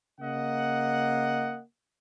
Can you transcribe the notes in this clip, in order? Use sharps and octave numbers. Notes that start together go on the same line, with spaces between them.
C#3 A#3 D#5 F#5